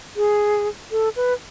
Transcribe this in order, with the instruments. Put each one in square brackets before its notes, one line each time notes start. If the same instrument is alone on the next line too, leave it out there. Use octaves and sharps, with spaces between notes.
[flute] G#4
A4
B4